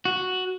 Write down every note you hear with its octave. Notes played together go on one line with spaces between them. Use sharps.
F#4